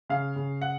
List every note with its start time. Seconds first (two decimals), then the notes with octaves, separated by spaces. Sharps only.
0.10 C#3 F5
0.36 C#3
0.61 F#5